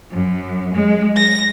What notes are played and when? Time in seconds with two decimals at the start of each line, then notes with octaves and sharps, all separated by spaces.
0.10 F#2
0.74 G#3
1.15 A#6